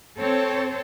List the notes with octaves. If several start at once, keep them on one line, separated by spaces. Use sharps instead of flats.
C4 A4 C5 C#5